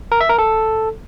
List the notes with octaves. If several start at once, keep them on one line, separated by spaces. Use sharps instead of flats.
A#4
E5
A#4
A4